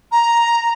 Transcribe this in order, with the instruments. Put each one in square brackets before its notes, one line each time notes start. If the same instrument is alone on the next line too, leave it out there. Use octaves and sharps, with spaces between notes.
[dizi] A#5